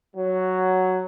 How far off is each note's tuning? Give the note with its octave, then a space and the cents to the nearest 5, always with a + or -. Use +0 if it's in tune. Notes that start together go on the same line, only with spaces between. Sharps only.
F#3 +5